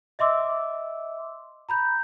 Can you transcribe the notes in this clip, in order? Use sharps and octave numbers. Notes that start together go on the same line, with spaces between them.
D#5 E5 C6 D6 E6
A#5 B5 G6